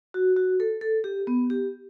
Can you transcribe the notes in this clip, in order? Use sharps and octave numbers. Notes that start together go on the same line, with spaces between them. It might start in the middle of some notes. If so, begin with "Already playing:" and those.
F#4
F#4
A4
A4
G4
B3
G4